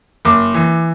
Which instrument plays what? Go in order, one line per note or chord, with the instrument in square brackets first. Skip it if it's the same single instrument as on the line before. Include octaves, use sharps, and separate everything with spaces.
[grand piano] F#1 D6
E3